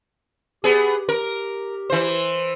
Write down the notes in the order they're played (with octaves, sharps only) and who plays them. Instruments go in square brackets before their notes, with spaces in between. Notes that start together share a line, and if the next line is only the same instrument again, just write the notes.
[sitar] B3 G#4 [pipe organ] G4
[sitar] A#4
E3 C5